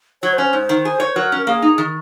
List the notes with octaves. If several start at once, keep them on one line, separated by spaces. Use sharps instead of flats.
F#3 C#5
C5
C#4
C5
G#2
D#3
G#4
C#5
F#3 A#4
C#4
A#3 G#4
D#4
D#3